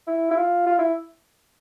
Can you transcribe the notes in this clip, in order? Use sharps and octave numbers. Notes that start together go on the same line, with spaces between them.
E4
E4
F4
F4
E4